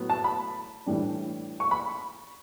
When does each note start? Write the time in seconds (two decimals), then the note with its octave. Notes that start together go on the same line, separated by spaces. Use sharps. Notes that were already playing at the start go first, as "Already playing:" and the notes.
Already playing: A2 F#3 B3
0.10 A5
0.24 B5
0.86 A2 E3 G3 D4
1.60 C#6
1.71 B5